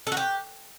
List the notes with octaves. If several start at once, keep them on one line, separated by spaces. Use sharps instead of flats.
A4
F#4
G4